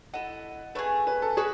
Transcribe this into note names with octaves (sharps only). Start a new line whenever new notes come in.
E4 A4 D#5 F#5
A3 C#4 G#4 B4
B4
A4
F#4 G#4 B4